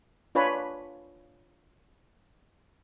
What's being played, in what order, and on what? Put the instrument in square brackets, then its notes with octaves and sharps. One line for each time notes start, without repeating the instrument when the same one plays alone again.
[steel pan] D4 F4 B4 C#5 G#5 B5